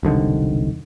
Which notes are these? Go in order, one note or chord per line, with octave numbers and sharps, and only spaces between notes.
E1 C2 D3 D#3